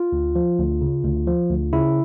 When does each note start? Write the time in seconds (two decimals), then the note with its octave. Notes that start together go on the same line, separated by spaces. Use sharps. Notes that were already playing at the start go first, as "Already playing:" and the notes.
Already playing: F4
0.12 D2
0.35 F3
0.58 D2
0.81 C#3
1.04 D2
1.27 F3
1.50 D2
1.73 C#3 E4